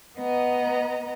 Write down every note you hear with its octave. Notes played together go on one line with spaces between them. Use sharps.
B3 D#5 A#5